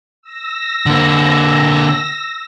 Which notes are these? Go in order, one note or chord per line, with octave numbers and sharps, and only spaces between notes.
E6 A#6
D3 A#3